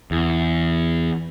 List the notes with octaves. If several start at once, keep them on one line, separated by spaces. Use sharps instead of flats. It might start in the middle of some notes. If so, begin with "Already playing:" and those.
E2